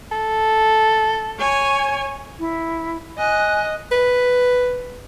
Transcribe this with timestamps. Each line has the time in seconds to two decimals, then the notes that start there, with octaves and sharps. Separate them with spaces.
0.12 A4
1.38 C#5 G#5
2.39 E4
3.18 D#5 G#5 F#6
3.92 B4